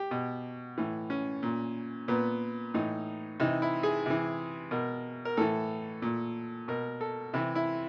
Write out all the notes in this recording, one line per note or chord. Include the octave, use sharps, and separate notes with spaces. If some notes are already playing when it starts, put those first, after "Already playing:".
Already playing: G4
B2
A2 E3
C#4
A#2
A#2 B3
A2 E3 D#4
C3 E3 D#4
E4
G#4
C3 E3
B2 A#4
A#4
A2 E3 A4
A#2
B2 A#4
A4
C3 E3 E4
E4